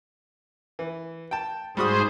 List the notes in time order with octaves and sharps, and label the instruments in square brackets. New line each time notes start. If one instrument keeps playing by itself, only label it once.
[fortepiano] E3
G5 A5
[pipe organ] G#2 G#4 C5 [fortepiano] G3 F#4 D#6